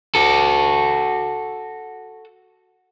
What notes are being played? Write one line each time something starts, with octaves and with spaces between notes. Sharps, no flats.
F#4 A4